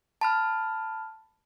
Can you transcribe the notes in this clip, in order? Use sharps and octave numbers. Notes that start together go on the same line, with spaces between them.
A5 B5 F6